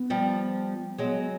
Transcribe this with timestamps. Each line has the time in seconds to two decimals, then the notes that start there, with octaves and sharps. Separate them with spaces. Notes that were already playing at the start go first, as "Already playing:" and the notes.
Already playing: B3
0.10 F3 G3
0.99 F#3 G#3 B3